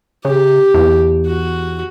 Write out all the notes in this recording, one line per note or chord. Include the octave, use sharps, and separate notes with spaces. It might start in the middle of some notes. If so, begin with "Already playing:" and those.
C#3 G4
E2
F#4